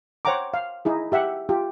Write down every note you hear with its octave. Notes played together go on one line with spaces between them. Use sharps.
C5 C#5 F#5 G5 A#5 D6
F5
D#4 E4 G#4
G4 E5 F#5
F4 G4